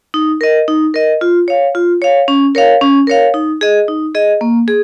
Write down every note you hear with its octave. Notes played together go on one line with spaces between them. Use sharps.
D#4
A#4 D#5
D#4
A#4 D#5
F4
C#5 F5
F4
C#5 F5
C#4
A#4 C#5 F5
C#4
A#4 C#5 F5
D#4
G#4 D#5
D#4
G#4 D#5
A#3
G#4